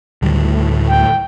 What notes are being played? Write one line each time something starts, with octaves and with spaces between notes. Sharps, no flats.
D2 A2 D3 D#3 G3
G5